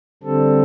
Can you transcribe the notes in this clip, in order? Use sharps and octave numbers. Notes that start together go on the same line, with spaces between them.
D3 G3 C4 A4